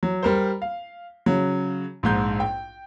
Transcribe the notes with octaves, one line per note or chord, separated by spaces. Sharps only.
F#3
G3 A#4 C5
F5
C#3 F#3
A#1 G#2 G6
G5